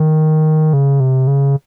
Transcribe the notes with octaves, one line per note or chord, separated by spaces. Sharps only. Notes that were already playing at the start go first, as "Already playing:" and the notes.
Already playing: D#3
C#3
C3
C#3